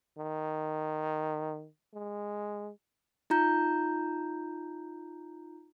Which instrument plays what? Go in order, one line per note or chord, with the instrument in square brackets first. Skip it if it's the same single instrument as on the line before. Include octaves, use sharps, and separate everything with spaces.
[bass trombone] D#3
G#3
[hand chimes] D#4 F4 A#5 G6